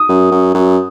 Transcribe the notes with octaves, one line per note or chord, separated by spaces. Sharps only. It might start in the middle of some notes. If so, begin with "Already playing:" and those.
Already playing: D#6
F#2
F#2
F#2